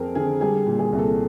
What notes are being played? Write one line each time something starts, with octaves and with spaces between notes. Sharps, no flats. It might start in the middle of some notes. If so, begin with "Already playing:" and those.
Already playing: F2 C4 G#4 A#4
D3 G#4
G3 G#4
A#2
G#4
C2
A4